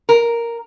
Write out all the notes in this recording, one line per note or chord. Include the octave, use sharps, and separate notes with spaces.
A#4